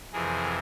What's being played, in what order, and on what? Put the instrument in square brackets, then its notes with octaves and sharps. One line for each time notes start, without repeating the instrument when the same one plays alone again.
[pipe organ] F2 C3 E3 G#4 A#4